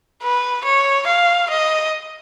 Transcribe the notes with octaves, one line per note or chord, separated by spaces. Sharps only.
B4
C#5
F5
D#5